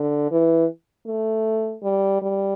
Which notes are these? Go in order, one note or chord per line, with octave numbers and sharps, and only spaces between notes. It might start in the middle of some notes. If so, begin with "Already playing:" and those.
Already playing: D3
E3
A3
G3
G3